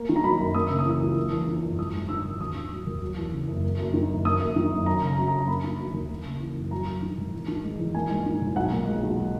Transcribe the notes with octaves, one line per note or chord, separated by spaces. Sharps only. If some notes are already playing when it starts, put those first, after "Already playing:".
Already playing: A#3
D#3
A#5
F#3 B5
F#2
A#3 D#6
C#3 E6
D#6
E3
C#2
A#3
E2
D#3
F#1
G#1 D#6
G#2
D#3 E6
G#1
D#2 D#6
D#3
F#3
D#2
F#3
E2
C#3
F#1
A#3
F#2
D#3
F#1
A#3 D#6
F#2
D#3
F#1
F#2 A#5
C#3 A#5
F#3
A#5
F#2
A#5
A#3 B5
D#3
F#3
D#2
A#3
C#3
E3
F#2
F#3 A#5
F#2
D#3
G#1
E2
D#3
G#3
E2
A#3 G#5
G#2
D#3
G#1
B1 F#5
A#2
G#3
B1